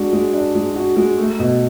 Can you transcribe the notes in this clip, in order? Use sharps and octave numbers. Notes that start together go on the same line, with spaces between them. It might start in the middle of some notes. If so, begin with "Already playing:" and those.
Already playing: G#3 D4 F#4
G#3
D4
G#3
F#4
G#3
A3
B2